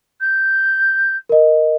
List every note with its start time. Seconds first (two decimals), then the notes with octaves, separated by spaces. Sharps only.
0.21 G6
1.29 A#4 D#5